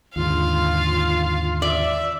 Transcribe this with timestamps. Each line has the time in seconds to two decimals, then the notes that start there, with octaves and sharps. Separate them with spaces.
0.16 D#2 G#2 D3 F4 F5
1.62 D5 E5